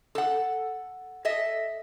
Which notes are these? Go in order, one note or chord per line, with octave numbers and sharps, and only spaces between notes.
A4 F#5
A4 D#5 E5